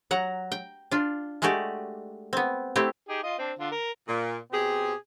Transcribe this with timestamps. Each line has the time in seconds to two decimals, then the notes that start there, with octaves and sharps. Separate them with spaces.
0.11 F#3 F#5 A#5
0.52 G5
0.91 D4 F4
1.42 G#3 A3 F#4 G4 D5
2.33 B3 C4
2.76 A3 C4 E4 G4
3.09 D#4 G4 G#4
3.23 F4 D#5
3.38 C4 D4
3.59 D3 F4
3.71 A#4
4.08 A#2
4.52 B2 C4 G4 G#4